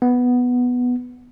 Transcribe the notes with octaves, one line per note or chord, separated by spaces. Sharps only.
B3